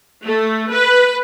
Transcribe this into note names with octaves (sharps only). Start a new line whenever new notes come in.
A3
B4